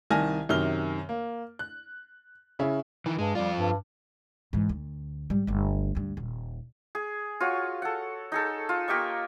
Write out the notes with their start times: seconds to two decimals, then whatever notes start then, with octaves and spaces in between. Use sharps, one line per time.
0.10 C2 D#3 G#5 A5 F6 A#6
0.49 F#2 C3 D#3 F6 G7
1.09 A#3
1.59 F#6
2.59 C#3 C#4 E4
3.06 D#3 E3
3.19 G2 G#3
3.35 F2 G3 F4
3.55 G2
4.53 G#2 E3
4.69 D2
5.30 G#2 G3
5.47 G1 A3
5.95 D2 G2
6.17 D#1
6.95 G#4
7.40 F4 F#4 C#5
7.82 A4 F#5
8.32 D#4 G#4 A4
8.69 F4
8.88 A#3 G4 D#5 C#6